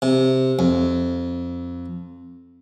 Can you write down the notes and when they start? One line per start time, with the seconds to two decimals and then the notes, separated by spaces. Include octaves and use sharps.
0.02 C3
0.59 F2